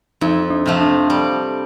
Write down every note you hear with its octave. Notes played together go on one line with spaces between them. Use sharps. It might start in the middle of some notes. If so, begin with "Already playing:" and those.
F2 D#4
D4
C3 F3 A3
D4
G3